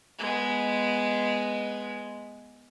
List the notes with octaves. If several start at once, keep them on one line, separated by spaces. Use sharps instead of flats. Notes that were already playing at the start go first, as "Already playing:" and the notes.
G#3 B3